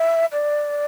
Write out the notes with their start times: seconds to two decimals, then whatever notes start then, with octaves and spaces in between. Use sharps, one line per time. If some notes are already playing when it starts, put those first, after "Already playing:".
Already playing: E5
0.32 D5